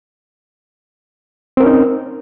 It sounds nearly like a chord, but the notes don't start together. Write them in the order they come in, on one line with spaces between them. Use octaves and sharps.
C4 A#4 C#4 D#4